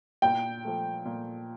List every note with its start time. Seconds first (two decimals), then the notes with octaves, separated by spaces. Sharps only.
0.22 A#2 G5
0.65 F3 A3
1.05 A#2